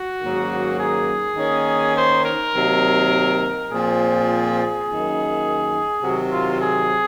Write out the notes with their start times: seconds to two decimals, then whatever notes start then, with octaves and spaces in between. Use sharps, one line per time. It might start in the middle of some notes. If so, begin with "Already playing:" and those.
Already playing: F#4
0.21 G#2 D#3 F#3 A#3 C#4
0.79 G#4
1.37 D#3 A#3 C#4
1.96 C5
2.25 A#4
2.54 C3 D#3 F#3 A#3
3.70 A#2 F3 C4 G#4
4.85 F#2 D#3 A#3
6.01 C3 D#3 F#3 F#4
6.31 F4
6.60 G#4